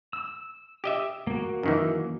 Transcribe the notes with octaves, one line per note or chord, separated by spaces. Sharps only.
E6
G4 D#5 E5
A#3 F#4
F#2 D#3 E3